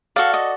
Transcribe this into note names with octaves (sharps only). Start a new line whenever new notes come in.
F#4 A4 D5 F5
D#5